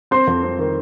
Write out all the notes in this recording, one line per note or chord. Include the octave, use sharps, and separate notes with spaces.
C4 C5 C6
F2
C4
D#3